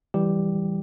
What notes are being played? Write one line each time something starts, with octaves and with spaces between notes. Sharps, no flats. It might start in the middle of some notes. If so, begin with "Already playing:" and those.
E3 G3 G4